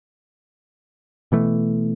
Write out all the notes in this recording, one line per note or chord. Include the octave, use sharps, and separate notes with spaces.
B2 E3 A3